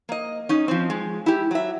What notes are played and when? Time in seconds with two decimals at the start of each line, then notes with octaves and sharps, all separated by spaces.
0.09 A#3 D#5
0.49 C#4 D#4
0.68 F3 C4
0.90 G#3
1.26 E4 G4
1.51 F#3 E5